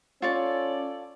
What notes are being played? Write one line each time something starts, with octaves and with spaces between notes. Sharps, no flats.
C#4 F4 A4 C#5 D5 A5